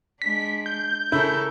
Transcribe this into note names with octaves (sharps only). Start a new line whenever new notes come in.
G#3 D4 B6
G6
C#3 E4 A4 A#4